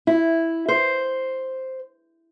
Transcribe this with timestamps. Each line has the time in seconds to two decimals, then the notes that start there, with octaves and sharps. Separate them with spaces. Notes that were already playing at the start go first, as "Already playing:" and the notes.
0.07 E4
0.68 C5